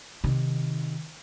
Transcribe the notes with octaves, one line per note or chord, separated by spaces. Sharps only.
C3 D#3